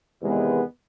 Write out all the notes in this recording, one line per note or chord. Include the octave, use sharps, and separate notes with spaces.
E2 C3 D#3 G#3 B3